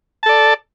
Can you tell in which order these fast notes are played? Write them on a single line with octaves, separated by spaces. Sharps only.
A5 A4 D5